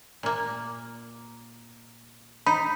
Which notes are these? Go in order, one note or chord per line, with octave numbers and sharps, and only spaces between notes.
A#2 A#3
D#4 B5